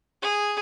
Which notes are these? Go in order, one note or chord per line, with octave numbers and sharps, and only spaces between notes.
G#4